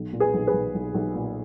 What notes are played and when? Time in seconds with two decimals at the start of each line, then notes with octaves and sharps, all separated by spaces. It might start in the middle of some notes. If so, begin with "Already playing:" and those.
Already playing: B1
0.13 A#2
0.20 G#4 B4
0.34 B1
0.47 G#4 B4
0.53 B1
0.74 B1
0.95 B1
1.15 A#2